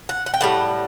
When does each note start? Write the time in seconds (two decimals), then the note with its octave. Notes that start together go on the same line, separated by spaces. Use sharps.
0.09 F#5
0.26 F#5
0.34 G5
0.41 A2 G3 F#5